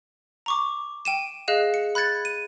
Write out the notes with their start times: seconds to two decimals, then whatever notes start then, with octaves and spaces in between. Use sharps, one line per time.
0.46 A#5 C#6 D6
1.05 G5 D#7 E7
1.48 G#4 D#5 F5 F#6 E7
1.74 C#7
1.95 B5 F#6 G#6 A6 C#7
2.25 D#7